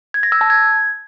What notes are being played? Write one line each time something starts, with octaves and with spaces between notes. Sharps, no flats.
G#6
A#6
E6
A5
G#6